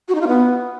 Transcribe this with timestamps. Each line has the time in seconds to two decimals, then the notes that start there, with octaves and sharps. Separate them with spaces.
0.08 F#4
0.15 D#4
0.21 F4
0.28 B3